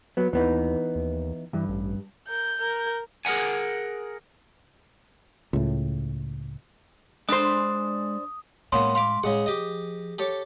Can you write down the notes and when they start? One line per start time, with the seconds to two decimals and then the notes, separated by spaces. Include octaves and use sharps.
0.17 F#3 B3
0.33 D#2 E3 B3 D#4
0.96 D#2
1.53 G2 E3
1.68 A1
2.28 A#4 G6
2.58 A#4
3.25 G#4 A#4 E5 F#5 G#5
5.53 C#2 A2
7.29 G#3 D4 C5 B5 D#6
8.72 A2 G#3 A#3 B3 C#4 C6
8.95 F5 B5 C6 D6
9.24 A2 C#3 G#3 G#4 F#5
9.46 F3 G4 D#5
10.19 G4 A4 C#5